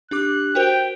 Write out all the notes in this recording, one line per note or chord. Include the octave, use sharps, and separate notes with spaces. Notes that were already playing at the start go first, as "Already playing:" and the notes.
D4 G4 D6 F#6
F#4 A#4 C5 G5